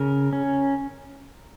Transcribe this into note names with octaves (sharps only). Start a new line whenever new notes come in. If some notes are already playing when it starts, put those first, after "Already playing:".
Already playing: C#3 A#4
C#4